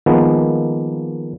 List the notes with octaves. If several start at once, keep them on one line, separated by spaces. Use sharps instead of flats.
D#3 F3 G#3 A#3 B3